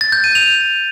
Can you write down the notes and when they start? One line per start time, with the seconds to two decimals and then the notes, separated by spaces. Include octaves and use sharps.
0.01 A6
0.12 G6
0.24 D#7
0.35 F7